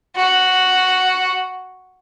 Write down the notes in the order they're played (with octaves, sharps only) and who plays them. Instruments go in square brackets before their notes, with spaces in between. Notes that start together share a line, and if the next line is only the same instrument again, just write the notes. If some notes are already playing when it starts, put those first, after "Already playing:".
[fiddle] F#4